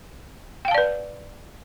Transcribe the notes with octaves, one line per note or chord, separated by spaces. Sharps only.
B4 D5 F5 G5 A5